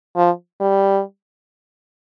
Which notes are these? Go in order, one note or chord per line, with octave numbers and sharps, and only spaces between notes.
F3
G3